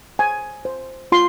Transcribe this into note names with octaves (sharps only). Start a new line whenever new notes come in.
C5 G#5
C5
F4 C6